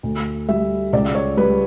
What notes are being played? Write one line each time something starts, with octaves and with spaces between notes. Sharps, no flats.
D2
G3 E5
C#2 D5
C#5
G3 B4